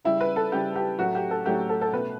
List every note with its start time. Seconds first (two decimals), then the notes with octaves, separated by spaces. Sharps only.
0.05 C#3 G3 E4
0.20 B4
0.36 A4
0.52 C#3 G3 G4
0.76 G4
0.99 A2 F#3 A3 F#4
1.15 G4
1.31 A4
1.46 A2 F#3 A3 G4
1.69 A4
1.81 A4
1.93 B2 A3 B4